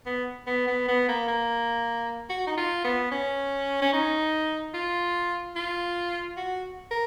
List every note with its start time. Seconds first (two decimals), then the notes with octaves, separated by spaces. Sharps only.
0.06 B3
0.47 B3
0.67 B3
0.88 B3
1.09 A#3
1.28 A#3
2.30 F#4
2.47 D#4
2.58 F4
2.85 B3
3.11 C#4
3.82 C#4
3.93 D#4
4.74 F4
5.56 F4
6.37 F#4
6.91 A#4